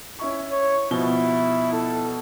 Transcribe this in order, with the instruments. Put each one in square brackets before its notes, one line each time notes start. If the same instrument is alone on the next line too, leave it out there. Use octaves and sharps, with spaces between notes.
[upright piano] C#4 E4 C#6
[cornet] C#5
[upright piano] B2 F3 G7 [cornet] E4
[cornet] A4